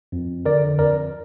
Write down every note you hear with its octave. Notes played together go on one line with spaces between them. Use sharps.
F2
D3 A#4 D5
F2 A#4 D5